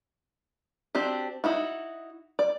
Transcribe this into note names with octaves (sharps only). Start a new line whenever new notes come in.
C4 D4 F#4 G4
D#4 E4 F#4
D5